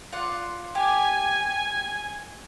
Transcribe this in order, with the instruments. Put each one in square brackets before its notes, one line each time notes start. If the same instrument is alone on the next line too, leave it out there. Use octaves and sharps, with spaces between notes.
[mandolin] F4 D5 F#5
[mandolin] G4 [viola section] G#5